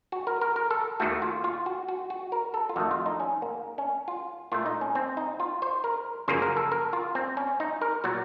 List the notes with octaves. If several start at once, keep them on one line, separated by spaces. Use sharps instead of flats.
F#4
A#4
A#4
A#4
A4
D#2 D#3 A3 F#4
F4
F4
F#4
F#4
F#4
A#4
A4
F4
F2 D#3 A3 F#4
F4
D#4
C#4
A#3
C#4
F4
A#2 A3 F4
D#4
C#4
C4
D#4
F4
C5
A#4
F#2 C#3 F3 A#3 C5
A#4
A4
A#4
F4
C4
C#4
D#4
A#4
A#2 F#3 F#4